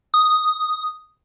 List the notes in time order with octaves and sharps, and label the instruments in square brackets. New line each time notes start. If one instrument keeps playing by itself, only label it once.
[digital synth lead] D#6